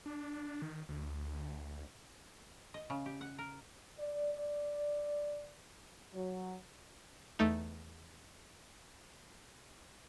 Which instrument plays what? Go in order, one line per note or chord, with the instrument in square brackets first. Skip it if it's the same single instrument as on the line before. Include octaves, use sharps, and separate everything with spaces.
[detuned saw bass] D4
D#3
D2
[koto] D#5
C#3
G4
F#5
A#4
[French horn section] D5
D5
F#3
[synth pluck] E2 A3 D#4